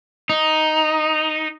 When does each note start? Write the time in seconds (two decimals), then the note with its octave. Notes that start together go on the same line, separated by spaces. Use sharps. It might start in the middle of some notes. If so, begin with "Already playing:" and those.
0.30 D#4